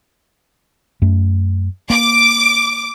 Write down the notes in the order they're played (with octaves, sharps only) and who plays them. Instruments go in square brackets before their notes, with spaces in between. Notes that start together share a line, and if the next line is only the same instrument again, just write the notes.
[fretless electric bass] F#2 A3
[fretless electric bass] A#3 [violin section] D6